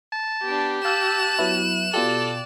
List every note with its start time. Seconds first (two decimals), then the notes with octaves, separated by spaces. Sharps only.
0.12 A5
0.44 B3 D4 G4
0.85 F5 A5 E6 F#6 G6 E7
1.39 F#3 B3 E4
1.94 B2 F4 G4 A4 D5